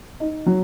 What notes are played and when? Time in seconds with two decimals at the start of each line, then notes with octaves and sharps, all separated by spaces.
0.20 D#4
0.46 F#3